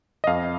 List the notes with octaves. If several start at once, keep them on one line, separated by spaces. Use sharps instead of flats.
D#5
F2 F5